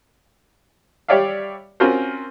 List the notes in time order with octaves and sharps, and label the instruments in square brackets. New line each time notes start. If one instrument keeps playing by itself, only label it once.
[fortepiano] G3 G4 C#5 D5 E5 F5
C4 C#4 F4 F#4 A#4 C5